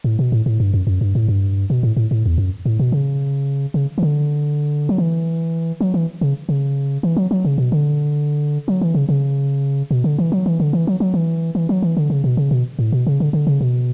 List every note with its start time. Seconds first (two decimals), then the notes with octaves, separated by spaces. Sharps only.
0.04 A2
0.19 B2
0.32 A2
0.46 A2
0.60 G2
0.74 F#2
0.87 F#2
1.01 G2
1.15 A2
1.28 G2
1.70 B2
1.83 A2
1.97 A2
2.11 A2
2.26 E2
2.38 F#2
2.66 A2
2.79 B2
2.92 C#3
3.74 C#3
3.98 E3
4.03 D3
4.89 F#3
4.98 E3
5.81 F#3
5.94 E3
6.21 C#3
6.49 C#3
7.03 E3
7.17 F#3
7.31 F#3
7.45 C#3
7.58 B2
7.72 D3
8.68 F#3
8.81 E3
8.95 C#3
9.09 C#3
9.91 B2
10.04 D3
10.18 E3
10.32 F#3
10.46 E3
10.60 D3
10.73 E3
10.87 F#3
11.00 F#3
11.14 E3
11.55 E3
11.69 F#3
11.82 E3
11.97 D3
12.10 C#3
12.24 B2
12.37 C#3
12.51 B2
12.79 A2
12.92 B2
13.07 C#3
13.20 D3
13.33 D3
13.47 C#3
13.61 B2